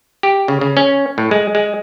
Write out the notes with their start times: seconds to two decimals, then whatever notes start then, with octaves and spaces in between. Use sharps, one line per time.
0.23 G4
0.48 C#3
0.61 C#3
0.77 C#4
1.18 A2
1.31 G#3
1.55 G#3